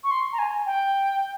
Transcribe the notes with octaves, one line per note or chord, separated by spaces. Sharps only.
C#6
C6
A#5
G#5
G5